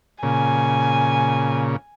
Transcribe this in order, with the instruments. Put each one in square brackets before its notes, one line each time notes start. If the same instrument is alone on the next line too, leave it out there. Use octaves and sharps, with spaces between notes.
[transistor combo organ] A#2 C#3 [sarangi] G#5